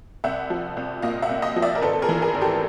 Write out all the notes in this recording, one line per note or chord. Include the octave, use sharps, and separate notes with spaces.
C2 E5 F#5
F3
C2
A#2 D#5 F5
E5 F#5
C2
D#5 F5
F3
D5 E5
A#4
G#1 A4 B4
A4
G#4 A#4
E3
G#4 A#4
G#1
G4 A4